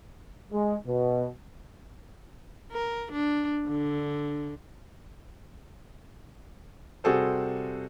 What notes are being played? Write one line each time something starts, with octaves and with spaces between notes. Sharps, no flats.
G#3
B2
A#4
D4
D3
C3 G3 F#4 G#4 A4 C5